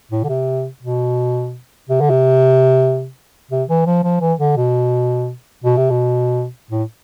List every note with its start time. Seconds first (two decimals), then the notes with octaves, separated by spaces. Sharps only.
0.12 A2
0.24 D3
0.30 C3
0.83 B2
1.89 C3
2.01 D3
2.10 C3
3.51 C3
3.69 E3
3.86 F3
4.04 F3
4.21 E3
4.40 D3
4.57 B2
5.64 B2
5.77 C3
5.90 B2
6.71 A2